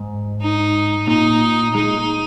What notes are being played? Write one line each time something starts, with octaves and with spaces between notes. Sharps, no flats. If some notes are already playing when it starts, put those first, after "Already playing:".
Already playing: G#2
D#4
A#2 D#4
G#3 D#4